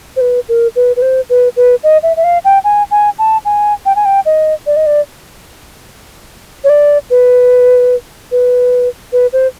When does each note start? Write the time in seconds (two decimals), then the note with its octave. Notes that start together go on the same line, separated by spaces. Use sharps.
0.16 C5
0.21 B4
0.49 A#4
0.76 B4
0.96 B4
1.02 C5
1.30 B4
1.56 B4
1.83 D#5
2.03 E5
2.17 E5
2.24 F5
2.45 G5
2.64 G#5
2.91 G#5
3.19 A5
3.45 G#5
3.86 G5
3.96 G#5
4.05 G5
4.26 D#5
4.66 D5
4.76 D#5
4.86 D5
6.64 C#5
6.69 D5
7.10 B4
8.32 B4
9.13 B4
9.33 C5